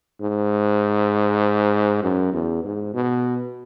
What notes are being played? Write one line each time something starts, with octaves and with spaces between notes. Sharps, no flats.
G#2
F#2
E2
G#2
B2